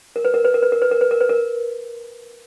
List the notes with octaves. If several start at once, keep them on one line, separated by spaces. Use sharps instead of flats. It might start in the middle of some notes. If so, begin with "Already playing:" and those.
A#4
B4
A#4
B4
A#4
B4
A#4
B4
A#4
B4
A#4
B4
A#4